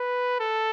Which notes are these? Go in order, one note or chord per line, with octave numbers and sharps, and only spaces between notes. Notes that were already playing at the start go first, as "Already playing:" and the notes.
Already playing: B4
A4